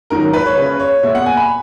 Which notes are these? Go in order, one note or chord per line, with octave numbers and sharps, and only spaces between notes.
G#2 D#3 F#3 A#4
B4
C#5
C#3 G#3 C#4 B4
C#5
A#2 G#3 B3 E5
F#5
G#5
B5